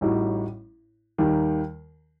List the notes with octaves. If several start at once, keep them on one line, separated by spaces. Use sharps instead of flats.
A1 A2 G3 D#4 F#4
D#2 D#3 G3